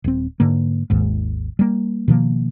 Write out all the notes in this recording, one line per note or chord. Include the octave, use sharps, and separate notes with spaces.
D#1 C4
G#2 D3 A#3
G#1 D#2 G#2
G3 A#3
B2 D#3 F3 A#3